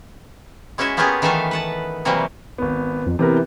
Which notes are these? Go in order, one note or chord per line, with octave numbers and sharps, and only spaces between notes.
G#3 C#4 E4 F#4 E5
A#3 B3 C#4 F4 G4 G#4
D#3 E3 A3 A4 E5 F5
B4 F#5 A5
C3 E3 F#3 G3 A#3
G#1 B3
F2
C3 E3 B3 A#4